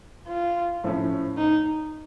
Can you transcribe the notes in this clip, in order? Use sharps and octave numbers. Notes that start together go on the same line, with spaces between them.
F4
A2 F3 A3 C#4 E4
D#4